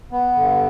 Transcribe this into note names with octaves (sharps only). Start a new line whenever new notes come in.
B3
G2 D3